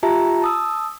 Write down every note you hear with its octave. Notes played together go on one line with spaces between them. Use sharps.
F4 G4 E5 A5 A#5
A5 D#6 E6